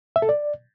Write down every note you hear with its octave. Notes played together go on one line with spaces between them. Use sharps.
E5
A4
D5